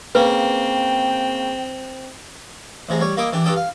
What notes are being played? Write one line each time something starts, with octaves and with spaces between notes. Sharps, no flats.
C#3 A#3 C4 B4 G5
A1 C3 G#4 A#5
G3 C#5
A#3 D#4 E4 D6 D#6
E3 D4 G4
G2 G3 D4 A4 G5 D#6
F5